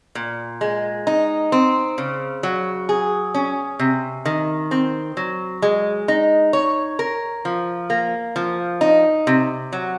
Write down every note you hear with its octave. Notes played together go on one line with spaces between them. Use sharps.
A#2
G#3
D#4
C4
C#3
F#3
G#4
C#4
C3
D#3
C4
F#3
G#3
D#4
C#5
A#4
F3
A#3
F3
D#4
C3
F#3